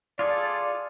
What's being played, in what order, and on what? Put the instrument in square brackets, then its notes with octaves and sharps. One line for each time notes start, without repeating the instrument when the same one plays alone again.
[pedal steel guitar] F4 G#4 A4 [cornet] D5